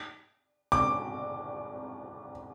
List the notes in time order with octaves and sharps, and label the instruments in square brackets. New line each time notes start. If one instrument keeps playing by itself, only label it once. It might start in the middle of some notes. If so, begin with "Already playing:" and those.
[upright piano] D6